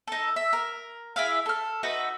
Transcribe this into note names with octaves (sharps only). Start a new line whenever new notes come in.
D#4 A4
E5
A#4
E4 G#4 E5 F5
A4 F6
D#4 F#4 B4 E5